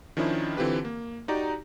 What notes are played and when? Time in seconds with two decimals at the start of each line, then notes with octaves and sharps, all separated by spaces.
0.17 D#3 F3 C#4 D4 E4
0.57 D3 E3 C4 F4 G4 B4
0.85 A#3
1.28 D#4 F#4 G4 D5 A#5